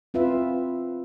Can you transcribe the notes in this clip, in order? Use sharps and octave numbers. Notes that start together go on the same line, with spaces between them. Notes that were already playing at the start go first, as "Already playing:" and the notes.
C4 F4 B4 E5